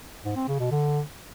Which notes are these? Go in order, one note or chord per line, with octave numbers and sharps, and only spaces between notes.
G#2
C4
C#3
B2
D3